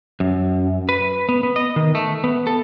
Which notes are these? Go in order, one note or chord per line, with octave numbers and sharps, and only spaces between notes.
F#2
B4
B3
B3
D#5
D#3
A3
B3
A4